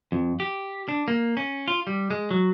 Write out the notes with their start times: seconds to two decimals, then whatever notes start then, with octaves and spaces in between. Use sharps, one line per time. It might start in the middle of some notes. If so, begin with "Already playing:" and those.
0.12 F2
0.40 G4
0.89 D4
1.08 A#3
1.37 C#4
1.68 F4
1.87 G3
2.11 G#3
2.31 F#3